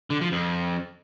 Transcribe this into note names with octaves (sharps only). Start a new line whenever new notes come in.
D3
F3
F2